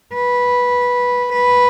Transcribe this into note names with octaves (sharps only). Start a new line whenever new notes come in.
B4
B4